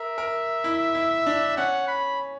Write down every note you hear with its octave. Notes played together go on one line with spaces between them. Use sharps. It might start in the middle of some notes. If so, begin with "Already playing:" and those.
Already playing: A#4 E5
A#4
E4
E4
D4
C#4 F#5
B5